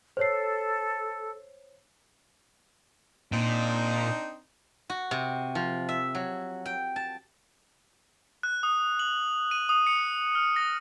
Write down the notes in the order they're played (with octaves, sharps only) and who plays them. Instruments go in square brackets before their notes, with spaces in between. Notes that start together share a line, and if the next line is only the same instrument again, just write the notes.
[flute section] A4 [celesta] C5 C#5 C7
[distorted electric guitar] A#2 [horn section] C4 D4 D#4
[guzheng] F#4
C3
F3
E5
F#3
G5
A5
[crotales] F#6
D#6
F#7
D#7
D#6
C#7
F6
A#6